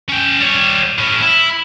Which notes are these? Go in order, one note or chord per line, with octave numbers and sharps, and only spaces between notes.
C#4 G5
G3 C#5
A2 C#4
E4